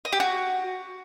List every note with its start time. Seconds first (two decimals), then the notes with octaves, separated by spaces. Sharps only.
0.05 D#5
0.12 G4
0.20 F#4